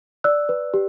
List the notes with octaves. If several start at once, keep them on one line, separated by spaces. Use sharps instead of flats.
D5 E6 F#6
B4
G4